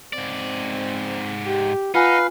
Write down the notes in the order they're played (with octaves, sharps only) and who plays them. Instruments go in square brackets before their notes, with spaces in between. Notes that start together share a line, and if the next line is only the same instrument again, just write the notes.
[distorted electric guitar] G#2 D5 [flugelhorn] C4
[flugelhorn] G4
[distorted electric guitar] D#4 [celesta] F4 G#5 [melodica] B4 F5 [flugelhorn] F#5